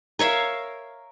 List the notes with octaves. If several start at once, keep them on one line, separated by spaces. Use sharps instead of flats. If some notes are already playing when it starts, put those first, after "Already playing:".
A#4 C#5 E5 F5